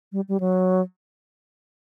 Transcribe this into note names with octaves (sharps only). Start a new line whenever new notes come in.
G3
G3
F#3